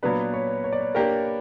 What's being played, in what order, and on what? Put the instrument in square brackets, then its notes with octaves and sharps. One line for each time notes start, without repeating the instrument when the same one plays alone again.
[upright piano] A#2 F#3 B3 D4 [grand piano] B4
[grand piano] C#5
C#5
D5
C#5
[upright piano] A#3 D4 G4 A#4 [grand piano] C#5